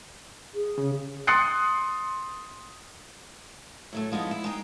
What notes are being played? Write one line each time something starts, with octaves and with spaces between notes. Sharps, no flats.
G#4
C#3
C6 D#6 F#6 A6 C7 C#7
A2 F#3 A3
F3 G#3 B3 D#4 E4
E4
G#3 D#4 G5